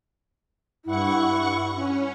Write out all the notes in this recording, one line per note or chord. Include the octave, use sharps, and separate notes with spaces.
G2 E4 F#5 C#6
C#4